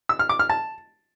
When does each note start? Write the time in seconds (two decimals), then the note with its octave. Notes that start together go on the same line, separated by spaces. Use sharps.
0.09 E6
0.19 F6
0.29 D6
0.39 F6
0.49 A5